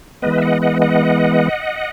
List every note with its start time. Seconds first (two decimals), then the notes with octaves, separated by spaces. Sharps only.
0.22 E3 G#3 B3 B4 D#5
0.38 E5
0.42 D#5 F#5
0.62 D#5 F#5
0.82 D#5 F#5